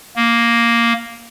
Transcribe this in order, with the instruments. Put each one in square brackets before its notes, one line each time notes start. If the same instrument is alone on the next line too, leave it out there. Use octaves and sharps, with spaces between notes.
[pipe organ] A#3